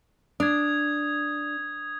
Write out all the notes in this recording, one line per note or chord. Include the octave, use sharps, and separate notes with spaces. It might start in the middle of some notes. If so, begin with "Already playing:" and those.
D4 D#6 G#6